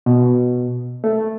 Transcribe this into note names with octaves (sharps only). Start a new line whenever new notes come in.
B2
A3